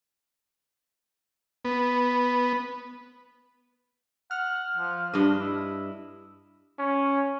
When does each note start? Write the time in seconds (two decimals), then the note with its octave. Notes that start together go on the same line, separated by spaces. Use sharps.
1.65 B3
4.31 F#5 F6
4.77 F3
5.14 G2 D4 D#5
5.40 E4
6.79 C#4